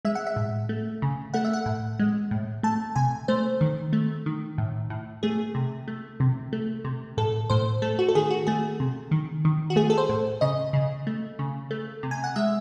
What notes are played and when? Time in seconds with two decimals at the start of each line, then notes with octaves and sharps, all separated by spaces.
0.05 G#3 E5
0.15 F#5
0.27 E5
0.36 A2
0.69 A3
1.02 C#3
1.34 A3 F#5
1.45 E5
1.53 F#5
1.66 A2
1.99 G#3
2.31 A2
2.63 A3 A5
2.96 C3 G#5
3.28 A3 C5
3.61 D#3
3.93 A3
4.26 D#3
4.58 A2
4.90 A2
5.23 A3 G#4
5.55 C3
5.88 A3
6.20 C3
6.53 A3
6.84 C3
7.17 A2 A4
7.50 A2 C5
7.82 A3 A4
7.99 F#4
8.08 A4
8.15 D#3 G#4
8.30 F#4
8.47 A3 G#4
8.80 C3
9.11 D#3
9.45 D#3
9.70 F#4
9.76 A3 G#4
9.90 A4
9.98 C5
10.09 A2
10.41 C#3 D#5
10.73 C#3
11.07 A3
11.39 C#3
11.71 A3
12.03 C3
12.11 G#5
12.24 F#5
12.36 G#3 E5